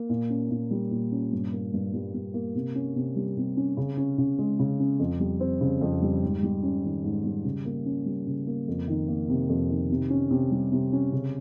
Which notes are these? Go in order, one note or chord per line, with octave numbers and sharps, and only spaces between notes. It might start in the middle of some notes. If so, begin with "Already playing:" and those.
Already playing: A#3
A#2
C#4
A#2
G3
A#2
C#4
G2
A#3
G2
G3
G2
A#3
C3
C#4
C3
G3
C3
C#4
C#3
C#4
C#3
G#3
C#3
C#4
F2
G3
C4
C#3
F2
G3
G#2
G3
C#4
D#3
G#2
G3
C#3
A#3
C#4
G3
C#3
A#3
F2
D#3
A#3
C3
F2
D#3
C3
C#4
C3
G3
C3
C#4
C#3